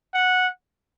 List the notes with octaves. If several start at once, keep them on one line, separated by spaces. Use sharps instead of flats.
F#5